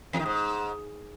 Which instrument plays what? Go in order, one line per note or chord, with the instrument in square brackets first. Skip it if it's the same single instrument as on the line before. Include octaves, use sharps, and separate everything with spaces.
[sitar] E2
D#3
G#2